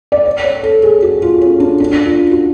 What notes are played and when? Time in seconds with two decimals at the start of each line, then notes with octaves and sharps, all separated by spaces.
0.12 D5
0.25 C#5
0.44 C#5
0.63 A4
0.83 G#4
1.02 F#4
1.22 F4
1.41 C#4
1.60 D4
1.80 D4
2.06 F4
2.31 F#4